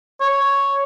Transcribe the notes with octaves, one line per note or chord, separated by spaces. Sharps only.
C#5